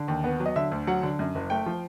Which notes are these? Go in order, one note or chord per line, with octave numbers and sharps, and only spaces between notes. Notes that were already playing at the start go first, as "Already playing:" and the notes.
Already playing: D3
D#2
B3
F#3
D#5
D3 E5
D2
F#3 F#5
D3
F#2
F#1
A3 G5
F3